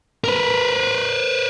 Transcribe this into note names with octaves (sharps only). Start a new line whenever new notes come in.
A#4 B4